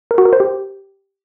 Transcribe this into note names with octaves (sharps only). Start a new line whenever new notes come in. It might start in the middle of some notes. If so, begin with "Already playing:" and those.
A#4
F#4
A#4
C5
G4